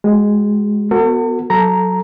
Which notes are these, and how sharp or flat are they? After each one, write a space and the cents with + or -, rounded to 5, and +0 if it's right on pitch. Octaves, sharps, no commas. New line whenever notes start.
G#3 +0 F#4 +25
B3 +0 F#4 +0 A4 +45
F#3 +0 A4 +0 A#5 +0